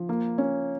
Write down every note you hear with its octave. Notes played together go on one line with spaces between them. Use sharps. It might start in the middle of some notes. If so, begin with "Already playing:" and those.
Already playing: F3
A#3
C#4